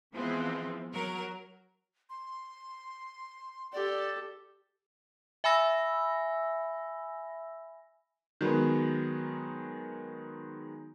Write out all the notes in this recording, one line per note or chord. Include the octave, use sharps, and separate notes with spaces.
E3 F3 G#3 B3 C4
F#3 A#4
C6
G4 A4 D5
E5 G#5 B5 E6 A#6
D#3 F#3 G#3 B3